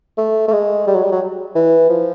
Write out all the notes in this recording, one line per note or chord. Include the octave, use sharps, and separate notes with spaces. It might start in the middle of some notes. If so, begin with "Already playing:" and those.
A3
A3
G#3
G3
F#3
G3
F#3
E3
F3